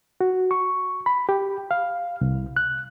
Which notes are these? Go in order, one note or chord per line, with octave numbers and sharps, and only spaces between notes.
F#4
C#6
B5
G4
F5
C2
F#6